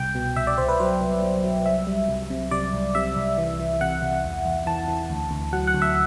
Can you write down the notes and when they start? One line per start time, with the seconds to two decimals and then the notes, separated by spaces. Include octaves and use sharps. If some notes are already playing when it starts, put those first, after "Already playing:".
Already playing: C2 G5
0.15 B2
0.36 C2 E5
0.47 D5
0.58 C2 C5
0.69 B4
0.80 F#3 C5
1.01 C2
1.22 F#3
1.44 F#3
1.66 C2 E5
1.87 G3
2.09 C2
2.30 C3
2.51 C3 D5
2.73 C2
2.95 C3 E5
3.17 C2
3.38 E3
3.60 E3
3.81 C3 F#5
4.02 C3
4.24 E2
4.45 E2
4.66 E3 A5
4.88 E3
5.09 D2
5.31 D2
5.53 F#3 F#5
5.67 F#5
5.74 D2
5.82 E5